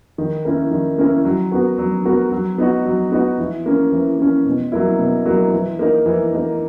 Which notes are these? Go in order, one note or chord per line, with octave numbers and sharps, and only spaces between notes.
D#3
A#3 C#4 E4 A#4
D#3
A#3 C#4 E4 A#4
F#3
B3 F#4 A#4
F#3
B3 F#4 A#4
F#3
B3 D#4 F#4
F#3
B3 D#4 F#4
E3
A#3 C#4
E3
A#3 C#4
B2
F#3 A#3 E4
B2
F#3 A#3 E4
E3
A#3 D#4 A#4
E3
A#3 D#4 A#4